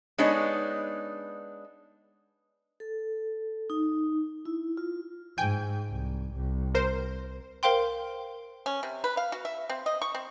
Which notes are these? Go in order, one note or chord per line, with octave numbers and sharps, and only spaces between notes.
G#3 B3 D4 D#4 C#5
A4
D#4
E4
F4
G#2 G5 G#5 G6
C2
C2
A#4 C5
A#4 C5 F5 G5 C6
C#4
C3
B4
F5
F#4
E5
C4
D#5
C#6
C4